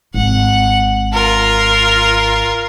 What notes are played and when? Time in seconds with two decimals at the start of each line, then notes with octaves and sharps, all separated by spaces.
0.14 G#1 F#5
1.14 F4 A#4